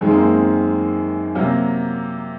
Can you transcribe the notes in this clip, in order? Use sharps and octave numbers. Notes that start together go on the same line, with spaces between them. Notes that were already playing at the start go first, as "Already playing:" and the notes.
F#2 D#3 G#3 C4
A#3
C4
C3 F#3 A#3